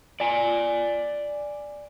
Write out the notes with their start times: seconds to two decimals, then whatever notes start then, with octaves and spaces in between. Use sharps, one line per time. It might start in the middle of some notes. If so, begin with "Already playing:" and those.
0.20 D5 G#5